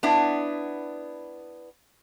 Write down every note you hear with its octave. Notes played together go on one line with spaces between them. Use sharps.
B3 D4 E4